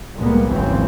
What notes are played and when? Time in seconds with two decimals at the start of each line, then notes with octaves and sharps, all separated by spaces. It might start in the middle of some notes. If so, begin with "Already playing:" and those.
0.14 C2 A2 G3 G#3 A#3 B3
0.47 G#1 D#2 C#3 E3 F#3 C4